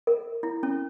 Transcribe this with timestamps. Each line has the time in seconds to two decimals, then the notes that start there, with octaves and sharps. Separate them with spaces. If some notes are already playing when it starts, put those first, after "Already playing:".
0.07 A#4
0.43 E4
0.63 C#4